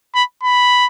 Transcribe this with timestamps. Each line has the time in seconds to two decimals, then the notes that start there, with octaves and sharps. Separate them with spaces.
0.15 B5
0.43 B5